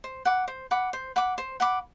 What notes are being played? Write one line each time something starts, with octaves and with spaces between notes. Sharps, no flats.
C5
F#5 B5 D6
C5
F#5 B5 D6
C5
F#5 B5 D6
C5
F#5 B5 D6